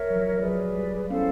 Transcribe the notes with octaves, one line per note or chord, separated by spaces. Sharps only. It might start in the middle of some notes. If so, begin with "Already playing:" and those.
Already playing: A#4 C#5 E5
F#3
F3
F3
F#3 G#4 B4 D5
G3
B3 C#4 E4 A4 C5 F5